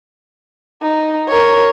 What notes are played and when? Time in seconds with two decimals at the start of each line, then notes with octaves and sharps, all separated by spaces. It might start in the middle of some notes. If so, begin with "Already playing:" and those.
0.82 D#4
1.28 A#4 C#5